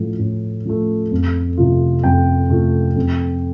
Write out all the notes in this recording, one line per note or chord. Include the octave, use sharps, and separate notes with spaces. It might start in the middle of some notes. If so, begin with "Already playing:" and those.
Already playing: A2 F3 A3
A2
F3 A3
F2
C3 A3 F4
F2 G5
C3 A3 F4
F2